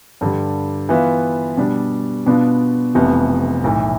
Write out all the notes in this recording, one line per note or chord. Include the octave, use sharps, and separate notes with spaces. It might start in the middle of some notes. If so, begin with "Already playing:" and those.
G2 D3 G3
E3 B3 F4 B4 E5
B2 G3 D4
B2 B3 D4 F4
F1 F2 C3 E3 B3
B1 A2 E3